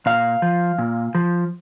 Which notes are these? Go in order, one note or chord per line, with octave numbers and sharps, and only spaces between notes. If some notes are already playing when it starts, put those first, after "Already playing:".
A#2 F5
F3
A#2
F3